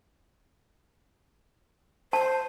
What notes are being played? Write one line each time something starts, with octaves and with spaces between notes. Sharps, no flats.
C5 A5